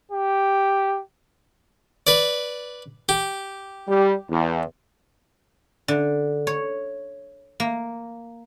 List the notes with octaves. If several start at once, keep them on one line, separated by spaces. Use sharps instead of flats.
G4
B4 D5
G4
G3
E2
D3
C#5
A#3